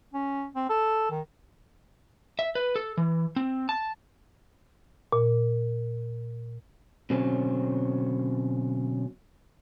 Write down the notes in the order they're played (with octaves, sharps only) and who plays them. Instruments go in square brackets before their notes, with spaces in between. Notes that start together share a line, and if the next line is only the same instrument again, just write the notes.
[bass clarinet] C#4
C4
A4
D#3
[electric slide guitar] E5
B4
A4
E3
C4
A5
[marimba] A#2
[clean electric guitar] B2 D3 F#3 C4 C#4